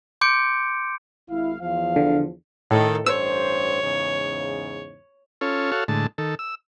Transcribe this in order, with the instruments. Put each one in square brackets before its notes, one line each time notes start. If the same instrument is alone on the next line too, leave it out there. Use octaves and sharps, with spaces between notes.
[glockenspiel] C6 D6 G6 C#7 D7
[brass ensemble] G#1 F5 [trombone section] E4
[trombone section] E2 F3 [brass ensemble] F5
[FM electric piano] D3
[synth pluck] A2 [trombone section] D#3 [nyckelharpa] A4
[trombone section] A1 G2 C5 [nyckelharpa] C#5 [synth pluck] E6
[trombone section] E2 G#2 C#3
[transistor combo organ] C#4 F4 A4 C#5
F#4 A4 C#5 F5
A2 D3 G#3 A5
D#3 A4
E6